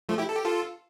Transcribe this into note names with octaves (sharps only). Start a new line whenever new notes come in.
F3 A3
E4 G4
A4
G4
F4 A4